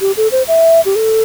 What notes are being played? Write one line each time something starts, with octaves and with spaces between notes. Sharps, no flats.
G4
A4
C5
E5
G4
A4